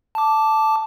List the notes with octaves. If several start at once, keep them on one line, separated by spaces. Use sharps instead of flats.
A5 D6